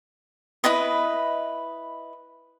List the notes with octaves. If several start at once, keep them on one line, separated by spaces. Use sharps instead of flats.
E4 B4 D#5 D#6